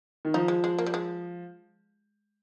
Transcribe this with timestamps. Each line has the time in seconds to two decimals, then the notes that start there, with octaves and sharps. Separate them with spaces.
0.25 D#3
0.34 F3 D#4
0.48 G#3
0.64 G#3
0.79 A#3
0.86 G3
0.94 G#3